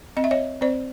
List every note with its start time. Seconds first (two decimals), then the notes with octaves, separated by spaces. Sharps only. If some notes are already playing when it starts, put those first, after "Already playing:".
0.17 C4 D#5
0.24 E5
0.31 C#5 D#5
0.61 C4 C5 D5